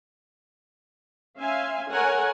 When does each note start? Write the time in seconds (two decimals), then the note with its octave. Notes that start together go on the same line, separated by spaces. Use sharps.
1.38 C#4 E5 F5 G#5 C6
1.89 A4 A#4 C#5 F#5 G#5